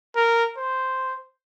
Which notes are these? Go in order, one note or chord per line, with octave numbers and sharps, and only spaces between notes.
A#4
C5